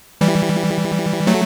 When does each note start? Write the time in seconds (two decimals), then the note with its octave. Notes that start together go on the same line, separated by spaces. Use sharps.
0.21 E3 G3
1.27 F#3 A3